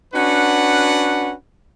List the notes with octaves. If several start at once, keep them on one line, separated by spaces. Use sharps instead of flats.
C#4 D4 F#4 B4 F#5